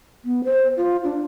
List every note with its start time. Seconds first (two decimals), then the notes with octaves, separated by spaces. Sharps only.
0.24 B3
0.44 C5
0.77 F4
1.04 D4